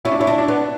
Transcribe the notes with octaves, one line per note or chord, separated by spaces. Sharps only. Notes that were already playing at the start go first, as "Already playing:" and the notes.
C#4 E4
D4
C#4 E4
D4
D4
B3